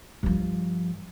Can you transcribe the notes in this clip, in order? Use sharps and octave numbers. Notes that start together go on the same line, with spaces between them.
G2 F3